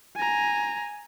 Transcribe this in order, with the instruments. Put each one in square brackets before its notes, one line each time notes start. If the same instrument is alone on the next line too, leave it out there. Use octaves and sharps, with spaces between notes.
[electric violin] G#5 A#5